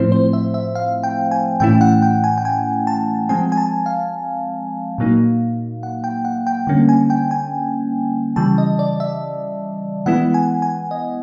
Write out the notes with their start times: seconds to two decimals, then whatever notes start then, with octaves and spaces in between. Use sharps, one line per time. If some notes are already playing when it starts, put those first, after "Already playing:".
Already playing: A2 F3 A3 C4 E4 C5
0.12 C5
0.33 E5
0.54 E5
0.75 F5
1.03 G5
1.31 G#5
1.60 A2 E3 A3 C#4 E4 G5
1.81 F#5
2.02 G5
2.24 G#5
2.38 G5
2.45 G#5
2.87 A5
3.29 F3 G#3 C4 G#5
3.52 G#5
3.57 A5
3.86 F5
4.98 A#2 F#3 A#3 D#4
5.83 F#5
6.04 G5
6.25 F#5
6.47 G5
6.67 D3 G3 A#3 C#4
6.89 G#5
7.10 G5
7.31 G#5
8.36 C#3 E3 G3 A5
8.58 D#5
8.79 D5
9.00 E5
10.06 E3 G#3 B3 E4 F#5
10.34 G#5
10.62 G#5
10.91 D#5